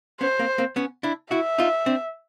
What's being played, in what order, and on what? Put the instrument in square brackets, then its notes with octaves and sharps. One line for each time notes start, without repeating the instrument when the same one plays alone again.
[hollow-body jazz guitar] B3 C#4 [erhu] C5
[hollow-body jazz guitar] A#3 C4
A#3 C4
B3 C#4
D4 E4
[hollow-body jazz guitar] E4 F#4 [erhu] E5
[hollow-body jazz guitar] D#4 F4
C4 D4